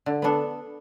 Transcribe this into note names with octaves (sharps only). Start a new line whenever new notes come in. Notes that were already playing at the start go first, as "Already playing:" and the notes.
D3
B3 D4 A4